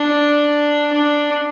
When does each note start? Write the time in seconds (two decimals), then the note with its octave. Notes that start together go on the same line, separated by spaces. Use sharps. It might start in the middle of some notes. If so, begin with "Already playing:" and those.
Already playing: D4
0.93 D4